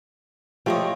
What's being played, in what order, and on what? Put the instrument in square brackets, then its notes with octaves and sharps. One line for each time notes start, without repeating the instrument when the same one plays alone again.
[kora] F3 A3 [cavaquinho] G4 C#5 D#5